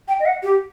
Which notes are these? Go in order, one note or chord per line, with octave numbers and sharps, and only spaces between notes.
G5
D#5
F#5
G4